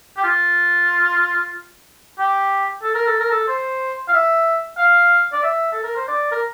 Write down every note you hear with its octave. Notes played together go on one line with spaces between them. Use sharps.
G4
F4
G4
A4
A#4
A4
A#4
A4
C5
F5
E5
F5
D5
E5
A4
A#4
C5
D5
A#4